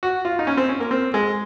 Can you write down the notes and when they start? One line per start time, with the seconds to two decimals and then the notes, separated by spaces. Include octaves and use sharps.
0.03 F#4
0.25 F4
0.39 D#4
0.47 C#4
0.57 C4
0.69 C#4
0.80 A#3
0.91 C4
1.14 G#3